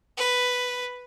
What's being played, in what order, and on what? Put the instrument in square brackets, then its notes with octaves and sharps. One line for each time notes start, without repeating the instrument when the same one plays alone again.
[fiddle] B4